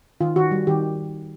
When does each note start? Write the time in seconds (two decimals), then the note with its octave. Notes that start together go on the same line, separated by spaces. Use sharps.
0.21 D#3 F4
0.36 D#3 F#4
0.51 G3
0.67 D#3 G4